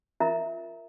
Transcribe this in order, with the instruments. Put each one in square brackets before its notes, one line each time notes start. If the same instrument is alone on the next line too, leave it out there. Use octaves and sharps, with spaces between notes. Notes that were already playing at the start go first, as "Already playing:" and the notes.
[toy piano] F4 A#4 D#5 E5 A#5